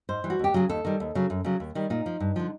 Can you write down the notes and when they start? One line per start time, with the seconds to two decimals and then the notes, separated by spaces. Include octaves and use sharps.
0.09 G#2 C5
0.24 E3 G3
0.30 F#4
0.39 D#2 G4
0.54 C#3 F#3 G#4
0.69 D#2 A4
0.85 D#3 G3
1.00 D#2
1.15 C#3 F#3
1.30 F#2
1.44 C#3 F#3
1.60 D#2
1.75 D#3 G3
1.90 A#2 D#4
2.06 F3
2.20 G2
2.36 D3 F3